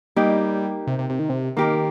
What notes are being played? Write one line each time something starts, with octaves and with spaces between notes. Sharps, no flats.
G3 A#3 D#4 G4
C3
C3
C3
D#3
C3
D#3 A#3 G4 A#4